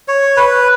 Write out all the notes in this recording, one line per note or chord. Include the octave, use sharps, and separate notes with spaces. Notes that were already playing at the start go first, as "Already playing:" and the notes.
C#5
B4